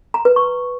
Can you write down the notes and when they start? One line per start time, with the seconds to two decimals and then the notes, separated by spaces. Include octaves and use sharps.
0.14 A#5
0.25 B4
0.36 C#6